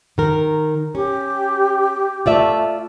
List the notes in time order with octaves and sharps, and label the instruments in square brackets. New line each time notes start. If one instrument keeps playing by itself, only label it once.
[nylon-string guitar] D#3 A#4
[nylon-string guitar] C#4 [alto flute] G4
[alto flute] A3 [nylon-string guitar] F4 D5 E5